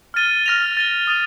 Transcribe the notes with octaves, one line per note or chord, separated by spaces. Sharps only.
F6 A6 D#7 G7
F6 A#6 F7
A6 D#7 G7
D#6 A6 D#7 G7